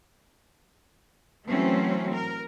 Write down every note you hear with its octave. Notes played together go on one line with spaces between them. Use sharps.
E3 F#3 A3 C4 C#4
A#4